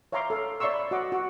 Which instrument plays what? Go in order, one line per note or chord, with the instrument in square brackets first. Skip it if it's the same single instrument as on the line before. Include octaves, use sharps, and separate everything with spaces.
[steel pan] C#5 E5 F5 A#5 C6 D6
A4 F5
C#5 D5 E5 C6 C#6 E6
B5
F#4 D#5 F#5 D6
F#4